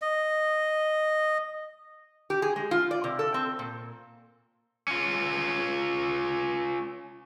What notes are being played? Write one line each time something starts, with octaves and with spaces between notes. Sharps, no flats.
D#5
G4
G#4
G#3
F4
D5
C3
A4
C4
A#2
C#4 F4